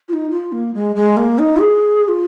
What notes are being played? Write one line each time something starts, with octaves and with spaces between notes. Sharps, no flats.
F4
D#4
F4
A#3
G#3
G#3
A#3
D#4
G#4
G#4
F4